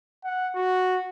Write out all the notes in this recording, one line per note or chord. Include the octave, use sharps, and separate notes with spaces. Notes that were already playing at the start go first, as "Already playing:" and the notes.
F#5
F#4